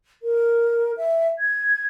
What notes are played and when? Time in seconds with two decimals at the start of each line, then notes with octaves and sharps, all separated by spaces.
0.22 A#4
0.97 E5
1.39 G#6